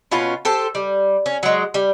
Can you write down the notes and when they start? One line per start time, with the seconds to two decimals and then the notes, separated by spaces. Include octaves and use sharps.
0.11 B2 C#4 F4 B4
0.45 G4 A4 C5
0.75 G3
1.26 C#4
1.43 F#3 G#3
1.74 G3